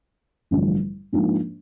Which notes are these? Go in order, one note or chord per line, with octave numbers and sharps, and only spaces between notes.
A1 G2 D3 F3
G#2 F3 A#3 D4